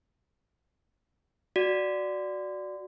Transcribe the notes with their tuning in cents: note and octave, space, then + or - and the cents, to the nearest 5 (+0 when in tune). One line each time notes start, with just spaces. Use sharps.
F#4 +0 D5 +0